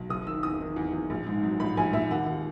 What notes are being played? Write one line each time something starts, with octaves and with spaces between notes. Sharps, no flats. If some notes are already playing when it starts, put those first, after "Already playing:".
Already playing: B1
F#1 D#6
D#3 E6
E2 D#6
D#3
E2
E2
A#1
G#2
F#3
A#1 B5
A#1 G#5
A#1 E5
D#2 F#5
D#2